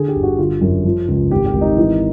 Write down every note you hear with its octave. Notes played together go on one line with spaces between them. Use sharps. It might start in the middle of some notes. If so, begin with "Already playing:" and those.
Already playing: D3 G#4
G4
G1
F#4
D3 F4
F#2
F3
C#2
G#1 G4
G4
G#1
D#4
E3